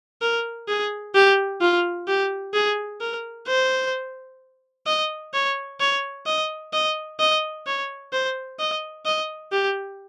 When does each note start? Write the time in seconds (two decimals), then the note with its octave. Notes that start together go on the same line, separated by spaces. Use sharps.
0.22 A#4
0.68 G#4
1.15 G4
1.61 F4
2.08 G4
2.54 G#4
3.01 A#4
3.48 C5
4.87 D#5
5.34 C#5
5.80 C#5
6.27 D#5
6.73 D#5
7.20 D#5
7.67 C#5
8.13 C5
8.59 D#5
9.06 D#5
9.52 G4